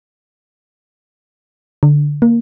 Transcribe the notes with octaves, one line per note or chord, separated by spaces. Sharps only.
D3
A#3